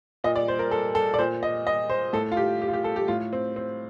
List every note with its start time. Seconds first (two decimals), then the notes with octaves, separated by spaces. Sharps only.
0.24 A#2 D#5
0.36 D5
0.48 C5
0.59 A#4
0.71 A4
0.95 A4
1.14 D5
1.19 A#2 C5
1.43 D#5
1.67 D#5
1.90 C5
2.13 A2 A4
2.32 F4
2.37 G4
2.61 G4
2.68 F4
2.73 G4
2.84 A4
2.96 G4
3.08 A2 F4
3.33 C4
3.56 C4